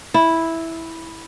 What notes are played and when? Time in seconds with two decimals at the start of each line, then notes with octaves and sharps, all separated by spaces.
0.14 E4